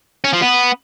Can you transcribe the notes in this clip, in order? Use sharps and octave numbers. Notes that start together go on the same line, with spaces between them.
C#4
F3
B3